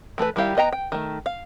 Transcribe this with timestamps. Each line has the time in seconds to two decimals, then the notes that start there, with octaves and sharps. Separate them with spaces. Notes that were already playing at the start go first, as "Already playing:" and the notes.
0.18 E3 A3 A4 B4
0.36 D#3 G3 E4 G4 F5
0.57 B3 D#5 G5 A#5
0.73 G5
0.92 D#3 A3
1.26 F5